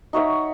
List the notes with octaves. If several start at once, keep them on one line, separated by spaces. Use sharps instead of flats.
D#4 F#4 C#5 E5